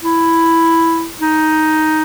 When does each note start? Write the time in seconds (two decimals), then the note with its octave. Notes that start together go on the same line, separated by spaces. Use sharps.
0.03 E4
1.20 D#4